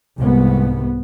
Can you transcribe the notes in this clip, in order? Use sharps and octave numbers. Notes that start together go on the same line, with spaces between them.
C2 G#2 B3